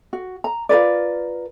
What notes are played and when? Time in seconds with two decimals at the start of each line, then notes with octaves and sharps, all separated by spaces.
0.13 F#4
0.44 A#5
0.69 F4 A#4 B4 D5